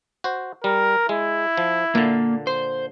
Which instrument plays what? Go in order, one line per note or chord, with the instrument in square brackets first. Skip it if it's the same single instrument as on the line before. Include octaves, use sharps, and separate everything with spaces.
[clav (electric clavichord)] F#4 C5
[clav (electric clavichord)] G3 [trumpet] A#4
[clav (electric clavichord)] G#3 [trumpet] E4
[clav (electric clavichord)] F3
[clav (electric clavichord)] A#2 D3 [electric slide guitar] A#3
[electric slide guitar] C5